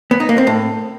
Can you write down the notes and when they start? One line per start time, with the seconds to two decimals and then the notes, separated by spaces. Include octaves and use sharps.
0.11 B3
0.20 D#4
0.29 A#3
0.38 C4
0.47 A2